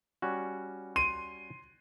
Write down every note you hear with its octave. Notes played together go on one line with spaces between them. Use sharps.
G3 C#4 F#4
C6 D#7